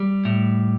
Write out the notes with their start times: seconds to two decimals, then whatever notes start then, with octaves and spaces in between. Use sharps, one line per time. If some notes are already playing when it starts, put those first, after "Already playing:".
Already playing: G3
0.25 A2